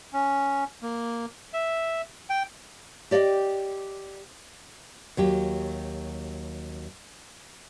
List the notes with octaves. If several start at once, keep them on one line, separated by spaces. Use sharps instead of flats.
C#4
A#3
E5
G5
G4 D5 D#5 F5 G5
D#2 F#3 G4